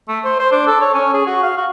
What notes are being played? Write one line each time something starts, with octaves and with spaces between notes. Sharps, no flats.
A3
C5
C5
D4
A4
C#5
C#4
G#4
F#4
F5
F#4